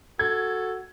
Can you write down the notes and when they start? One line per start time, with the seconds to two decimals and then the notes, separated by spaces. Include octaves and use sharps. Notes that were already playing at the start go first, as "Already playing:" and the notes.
0.19 F#4 A4 G#6